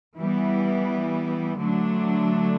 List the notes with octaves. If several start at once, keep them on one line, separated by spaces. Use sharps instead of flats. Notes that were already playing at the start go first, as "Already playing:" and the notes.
E3 G3 B3
D3 F#3 A3 D4